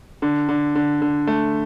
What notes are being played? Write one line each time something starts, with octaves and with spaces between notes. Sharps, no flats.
D3
D3
D3
D3
A3